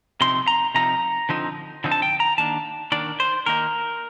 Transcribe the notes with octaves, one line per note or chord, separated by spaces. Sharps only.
C3 F3 C4 D#4 C6
A#5
C3 F3 C4 D#4 A#5
D3 F3 C4 D#4
D3 F3 C4 D#4
A5
G5
A#5
D#3 A#3 D4 A5
D#3 A#3 D4 D5
C5
D#3 A#3 D#4 A#4